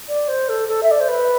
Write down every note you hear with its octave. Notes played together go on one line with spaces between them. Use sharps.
D5
C5
A4
A4
E5
D5
C5
B4